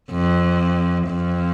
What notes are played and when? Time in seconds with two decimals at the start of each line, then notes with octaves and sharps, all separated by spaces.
0.11 F2
1.08 F2